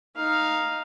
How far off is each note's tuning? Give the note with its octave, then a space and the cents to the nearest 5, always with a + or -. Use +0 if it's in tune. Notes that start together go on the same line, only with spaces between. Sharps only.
D#4 +0 F5 +0